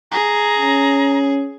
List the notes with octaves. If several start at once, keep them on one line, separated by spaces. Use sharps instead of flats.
G#4 A#5
C#4